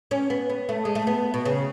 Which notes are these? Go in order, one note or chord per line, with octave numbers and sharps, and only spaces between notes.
C#4
B3
B3
A3
G#3
A3
B3
B2
C#3